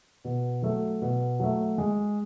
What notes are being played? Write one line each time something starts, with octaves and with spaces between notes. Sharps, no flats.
B2
F#3 A3
B2
F#3 A3
G#3